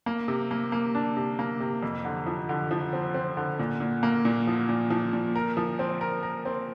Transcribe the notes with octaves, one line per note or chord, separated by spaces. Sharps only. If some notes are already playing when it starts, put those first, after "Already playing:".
A#3
C3
A#3
A#3
D4
C3
A#3
C3
F2
D3
F3
D3
F3
C4
C4
D3
A#2
A#2
A#3
A#2
F3
A#2
F3
A#2
A#4
F3
C4
A#4
A#4
C4